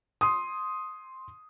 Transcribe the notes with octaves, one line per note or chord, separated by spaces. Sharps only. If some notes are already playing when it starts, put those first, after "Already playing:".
C6 D#6